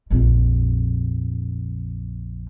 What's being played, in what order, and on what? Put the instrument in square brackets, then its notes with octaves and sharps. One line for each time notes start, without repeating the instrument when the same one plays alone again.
[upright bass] A#1 F2